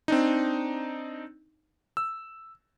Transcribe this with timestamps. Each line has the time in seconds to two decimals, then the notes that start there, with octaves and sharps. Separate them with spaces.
0.08 C4 D4 D#4
1.97 E6